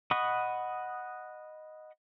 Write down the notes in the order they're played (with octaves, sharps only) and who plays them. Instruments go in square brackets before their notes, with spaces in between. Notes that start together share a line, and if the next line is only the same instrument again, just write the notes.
[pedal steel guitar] D#5 F#5 B5 C#6 D#6